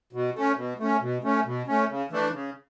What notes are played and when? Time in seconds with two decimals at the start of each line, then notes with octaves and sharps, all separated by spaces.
0.13 B2
0.35 A3 C#4
0.56 B2
0.79 A3 C#4
1.01 B2
1.23 A3 C#4
1.45 B2
1.67 A3 C#4
1.89 C#3
2.11 E3 A3 D4
2.33 C#3